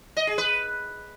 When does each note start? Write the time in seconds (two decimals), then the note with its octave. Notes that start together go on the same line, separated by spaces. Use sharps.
0.17 D#5
0.27 G#4
0.38 B4